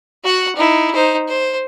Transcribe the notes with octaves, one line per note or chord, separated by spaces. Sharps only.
F#4 F#5
D#4 E4
D#4 C5
C5